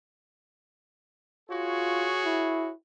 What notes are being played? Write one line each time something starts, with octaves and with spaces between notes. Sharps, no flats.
F4 F#4 G#4 C#5
E4